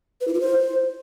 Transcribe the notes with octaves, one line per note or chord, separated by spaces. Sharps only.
B4
E4
F4
C5